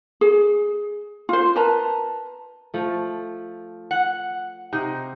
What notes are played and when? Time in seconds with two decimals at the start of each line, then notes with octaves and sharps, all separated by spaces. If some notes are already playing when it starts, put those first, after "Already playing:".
0.21 G#4
1.29 F4 C5
1.56 A#4 B4 A5 A#5
2.74 F3 A3
3.91 F#5
4.73 C3 D#4